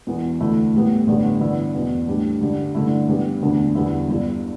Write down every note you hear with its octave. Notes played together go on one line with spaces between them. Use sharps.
E1 E2 E3 B3
D2 D3 A3 E4
A2 G3 B3
A1 G2 D3 G3 B3
G2 D3 B3 E4
E2 B2 B3
A2 G3 D4
G2 D3 G3
G2 D3 A3 E4
G2 G3 B3
E1 D2 D3 B3 D4
E2 D3 G3 B3 E4
G1 G2 G3 E4